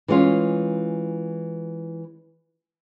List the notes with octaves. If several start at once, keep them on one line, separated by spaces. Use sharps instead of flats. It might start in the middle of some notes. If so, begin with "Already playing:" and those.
E3 G#3 C#4 F4